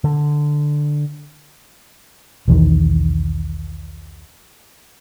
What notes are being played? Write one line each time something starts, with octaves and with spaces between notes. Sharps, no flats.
D3
B1 E2 D#3 E3